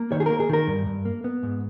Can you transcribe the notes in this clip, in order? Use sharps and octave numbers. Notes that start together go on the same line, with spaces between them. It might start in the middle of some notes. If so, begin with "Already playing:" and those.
Already playing: A#3
D#3 C#5
G#4
A#3 A#4
G#4
D#3 A#4
G2
G2
A#3
B3
G#2